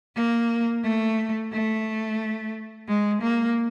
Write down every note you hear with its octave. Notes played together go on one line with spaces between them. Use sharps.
A#3
A3
A3
G#3
A#3